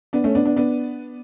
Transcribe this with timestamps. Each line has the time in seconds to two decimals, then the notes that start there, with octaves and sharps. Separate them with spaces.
0.13 B3 D4
0.24 A3 C#4
0.35 B3 D4
0.45 B3 D4
0.56 B3 D4